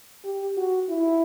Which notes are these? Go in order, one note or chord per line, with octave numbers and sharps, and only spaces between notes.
G4
F#4
E4